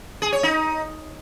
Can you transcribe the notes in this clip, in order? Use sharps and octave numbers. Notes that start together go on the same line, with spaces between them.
G#4
C#5
D#4